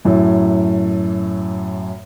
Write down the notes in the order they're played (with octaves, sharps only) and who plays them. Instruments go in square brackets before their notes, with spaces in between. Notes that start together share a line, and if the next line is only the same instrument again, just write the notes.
[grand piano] F#2 A2 F#3